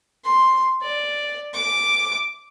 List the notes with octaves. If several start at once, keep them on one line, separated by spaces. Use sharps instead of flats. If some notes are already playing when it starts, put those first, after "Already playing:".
C6
D5
D6